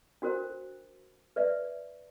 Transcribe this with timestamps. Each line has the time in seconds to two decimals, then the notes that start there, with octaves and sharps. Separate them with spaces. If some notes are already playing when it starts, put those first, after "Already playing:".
0.22 D4 F#4 A#4 C5
1.36 B4 D5 E5